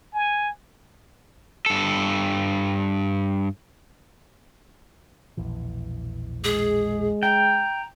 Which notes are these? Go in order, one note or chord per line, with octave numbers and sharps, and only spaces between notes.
G#5
G2 A4
E1 A#1 E3
G#3 G#4
G5 A#5